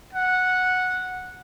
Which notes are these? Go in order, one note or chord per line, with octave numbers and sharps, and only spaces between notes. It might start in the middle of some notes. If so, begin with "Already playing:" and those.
F#5